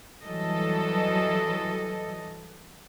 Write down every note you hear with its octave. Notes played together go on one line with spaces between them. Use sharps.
E3 F#3 G3 A4 D#5